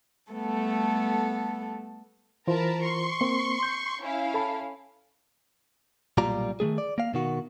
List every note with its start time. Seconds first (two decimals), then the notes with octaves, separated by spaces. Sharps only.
0.32 G3 A3 B3 A4
2.47 E3 F4 A#4 C5 A5 B5
2.81 C6 C#6
3.21 A#3 C4
3.63 G6
4.01 C#4 E4 F5
4.34 A4 A5 B5
6.18 B1 A#2 G3 F4 D5 A#5
6.60 D#3 F3 A3 G#4
6.78 D5
6.98 A#3 F5
7.14 B2 D#3 F#4